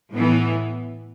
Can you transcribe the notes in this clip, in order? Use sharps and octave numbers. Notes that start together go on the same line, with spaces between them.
A2 E3 B3